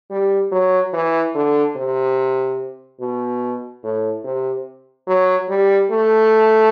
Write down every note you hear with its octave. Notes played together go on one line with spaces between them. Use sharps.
G3
F#3
E3
D3
C3
B2
A2
C3
F#3
G3
A3